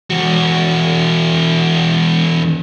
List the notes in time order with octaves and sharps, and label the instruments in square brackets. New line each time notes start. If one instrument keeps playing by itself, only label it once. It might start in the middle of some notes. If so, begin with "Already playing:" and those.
[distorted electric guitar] E2 F#4